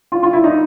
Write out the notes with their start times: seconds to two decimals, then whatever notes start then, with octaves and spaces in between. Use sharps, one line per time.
0.12 F4
0.23 F4
0.33 E4
0.44 D#4